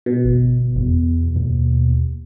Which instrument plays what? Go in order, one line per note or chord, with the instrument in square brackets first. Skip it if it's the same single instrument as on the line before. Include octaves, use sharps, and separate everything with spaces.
[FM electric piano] B2
[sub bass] G1
E2
D#2